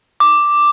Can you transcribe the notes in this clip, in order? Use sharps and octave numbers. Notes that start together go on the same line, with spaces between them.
D6